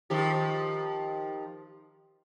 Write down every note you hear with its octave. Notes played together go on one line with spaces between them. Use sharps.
D#3 F3 G4